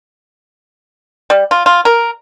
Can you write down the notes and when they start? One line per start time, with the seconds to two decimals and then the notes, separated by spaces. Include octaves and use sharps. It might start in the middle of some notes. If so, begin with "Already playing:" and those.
1.30 G3
1.51 F4
1.66 F4
1.85 A#4